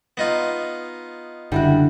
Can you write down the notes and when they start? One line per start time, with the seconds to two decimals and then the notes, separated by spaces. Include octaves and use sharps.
0.17 B3 D#4 F4
1.52 F#1 D3 G3 E4 F#4